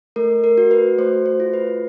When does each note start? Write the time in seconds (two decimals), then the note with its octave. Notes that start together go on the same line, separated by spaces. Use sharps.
0.16 A3 A#4
0.44 A#4
0.58 F#4
0.71 B4
0.98 A3 C5
1.26 C5
1.40 F4
1.53 B4